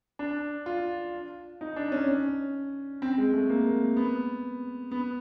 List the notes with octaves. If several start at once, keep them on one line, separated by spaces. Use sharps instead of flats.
D4
F4
D#4
D4
C#4
C#4
C4
G#3
A3
A#3
B3
B3